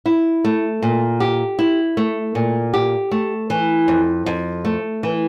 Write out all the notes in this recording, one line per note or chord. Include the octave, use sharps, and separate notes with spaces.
E4
A3
A#2
G4
E4
A3
A#2
G4
A3
E3
F2
F2
A3
E3